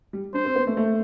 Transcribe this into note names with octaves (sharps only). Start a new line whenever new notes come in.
G3
D4 C5
C4
B3
A3
A3